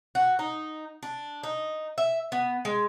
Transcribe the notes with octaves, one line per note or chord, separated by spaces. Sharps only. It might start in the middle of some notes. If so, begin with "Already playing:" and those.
F#4
D#4
D4
D#4
E5
B3
G#3